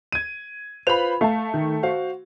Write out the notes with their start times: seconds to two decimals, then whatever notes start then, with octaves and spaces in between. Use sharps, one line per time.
0.12 G#6 D#7
0.87 F4 B4 C5 B5 F7
1.21 A3 F5 A5
1.54 D#3
1.83 F#4 C5 F5